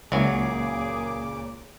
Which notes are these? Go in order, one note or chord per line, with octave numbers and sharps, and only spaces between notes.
C#2 A#2 C#3 E3 F#3 A#3 G#4 D6